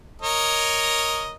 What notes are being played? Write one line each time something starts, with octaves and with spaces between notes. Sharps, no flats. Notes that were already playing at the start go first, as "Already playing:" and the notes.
A#4 C#5 D#5